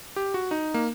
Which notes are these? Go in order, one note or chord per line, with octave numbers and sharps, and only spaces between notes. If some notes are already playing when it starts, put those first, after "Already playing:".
G4
F#4
D#4
A#3